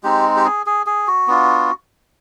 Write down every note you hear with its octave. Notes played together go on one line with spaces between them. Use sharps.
G#3 C4 D#4 G4
G4
G#4
G#4
G#4
F#4
B3 D4 F4